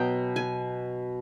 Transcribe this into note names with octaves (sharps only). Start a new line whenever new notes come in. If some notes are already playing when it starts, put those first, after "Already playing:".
Already playing: B2 F#3 B3 G5
G#5